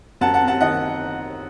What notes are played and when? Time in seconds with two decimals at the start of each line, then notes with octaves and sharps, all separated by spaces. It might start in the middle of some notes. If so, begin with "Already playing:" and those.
0.21 F#2 F#5 A5
0.34 F#5 A5
0.41 C4
0.47 F#5 A5
0.61 D#3 D#5 F#5